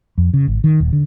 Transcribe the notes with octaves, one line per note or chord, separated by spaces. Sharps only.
F2
C#3
G#1
D#3
D#1
D3